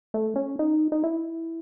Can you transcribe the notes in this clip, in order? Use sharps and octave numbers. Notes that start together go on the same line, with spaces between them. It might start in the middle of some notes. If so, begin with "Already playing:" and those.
A3
C#4
D#4
D#4
E4